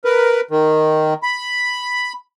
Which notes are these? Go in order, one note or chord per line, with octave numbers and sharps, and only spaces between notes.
A#4 B4
D#3
B5